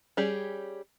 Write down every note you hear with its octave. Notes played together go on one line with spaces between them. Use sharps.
G3 C#4 G4 G#4